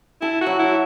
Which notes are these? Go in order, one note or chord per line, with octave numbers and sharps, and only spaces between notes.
E4 A4
F#4
F#3
E4